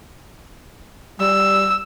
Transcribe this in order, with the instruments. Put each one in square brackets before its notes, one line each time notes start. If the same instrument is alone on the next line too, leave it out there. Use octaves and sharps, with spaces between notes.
[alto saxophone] G3 [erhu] E6